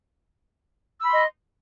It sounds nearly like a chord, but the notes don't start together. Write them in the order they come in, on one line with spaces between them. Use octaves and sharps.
E6 B5 C6 D#5